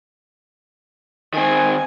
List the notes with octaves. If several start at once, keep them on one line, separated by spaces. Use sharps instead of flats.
D#3 C4 G#5